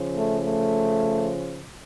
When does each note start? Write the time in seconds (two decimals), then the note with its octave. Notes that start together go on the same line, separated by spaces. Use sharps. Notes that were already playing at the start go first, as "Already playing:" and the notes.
Already playing: C#3 F3
0.15 A3
0.45 A3